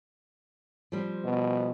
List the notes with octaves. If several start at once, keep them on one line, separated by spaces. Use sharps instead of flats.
F3 G3 C4
B2